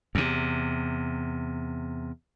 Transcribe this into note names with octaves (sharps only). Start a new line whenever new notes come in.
E2 C3